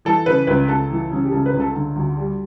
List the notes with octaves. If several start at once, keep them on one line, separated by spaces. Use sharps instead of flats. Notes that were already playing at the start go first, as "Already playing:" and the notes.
E3 A4
C#3 B4
C#2 B4
C#2 A4
E3
C#3
G4
C#2 A4
B4
C#2
A4
D3
D2
G3